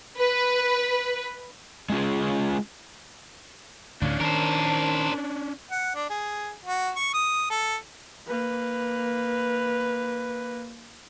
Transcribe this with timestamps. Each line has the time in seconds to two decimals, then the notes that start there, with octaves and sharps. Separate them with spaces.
0.18 B4
1.90 G#3 A3 C#4 F4 G#4
4.02 D2 A2 D3 C#4 D4 F5
4.21 D#3 A#4 C5 A5
5.72 F#5
5.95 D4
6.10 G#4
6.65 F#4
6.96 C#6
7.14 D#6
7.50 A4
8.27 A#3 B4